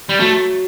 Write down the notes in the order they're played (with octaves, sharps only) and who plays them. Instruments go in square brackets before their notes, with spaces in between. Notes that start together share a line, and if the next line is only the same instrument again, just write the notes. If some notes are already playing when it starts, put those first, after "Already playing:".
[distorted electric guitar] G3
[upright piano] F#3 [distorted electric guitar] A3